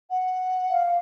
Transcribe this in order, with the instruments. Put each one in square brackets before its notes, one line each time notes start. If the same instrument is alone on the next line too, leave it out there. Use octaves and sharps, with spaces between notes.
[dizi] F#5
[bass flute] F5